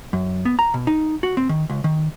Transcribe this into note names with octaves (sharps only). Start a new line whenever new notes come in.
F#2
B3
A#5
B2
D#4
F#4
C4
D#3
C#2
D#3